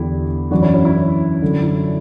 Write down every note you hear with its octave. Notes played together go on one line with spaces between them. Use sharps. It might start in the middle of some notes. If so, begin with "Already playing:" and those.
Already playing: E2 D3 E4 G4
F#2 E3 D4 F#4
C#4 E4
C#4 E4
C#4 E4
F#2 D3
E4
D4